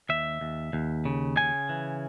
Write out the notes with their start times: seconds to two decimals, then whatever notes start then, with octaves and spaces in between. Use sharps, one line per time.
0.09 D#2 E5
0.41 D#2
0.73 D#2
1.05 C#3
1.37 C#3 G#5
1.69 E3